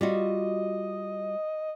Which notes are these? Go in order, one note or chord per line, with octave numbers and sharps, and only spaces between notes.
G3 F4 F#4 D#5